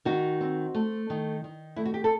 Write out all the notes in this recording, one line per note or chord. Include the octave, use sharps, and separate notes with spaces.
D#3 D#4 F#4
C4
A3
D#3
D#3
A3 E4
F#4
G4
A4